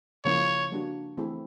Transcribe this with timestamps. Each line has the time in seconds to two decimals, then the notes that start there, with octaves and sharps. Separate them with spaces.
0.25 C#3 F3 A#3 C#4 E4 C#5
0.72 G3 A#3 D4 F#4
1.17 E3 A3 C4 E4 G#4